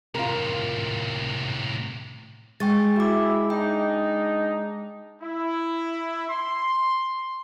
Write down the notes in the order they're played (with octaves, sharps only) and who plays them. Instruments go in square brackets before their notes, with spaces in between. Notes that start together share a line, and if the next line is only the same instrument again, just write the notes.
[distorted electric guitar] A2 C3 [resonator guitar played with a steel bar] F4 A#4
[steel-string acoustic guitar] G#3 [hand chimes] G5 C#6 A6
[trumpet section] E4 [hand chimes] F#4 D6
[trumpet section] D4 D#4 [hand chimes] G5
[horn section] E4
C6